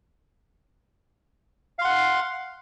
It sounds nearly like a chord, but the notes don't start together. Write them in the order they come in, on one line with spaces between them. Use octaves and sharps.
F5 C6 F#5